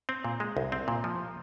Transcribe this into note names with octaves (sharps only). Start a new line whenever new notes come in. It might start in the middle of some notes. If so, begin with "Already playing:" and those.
C4
A#2
G#3
C2
C4
A#2
F3